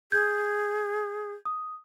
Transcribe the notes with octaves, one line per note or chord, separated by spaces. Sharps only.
G#4 G6 G#6
D#6